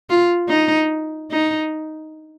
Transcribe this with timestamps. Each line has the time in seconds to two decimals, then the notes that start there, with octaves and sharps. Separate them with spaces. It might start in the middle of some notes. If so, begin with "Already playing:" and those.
0.10 F4
0.49 D#4
1.31 D#4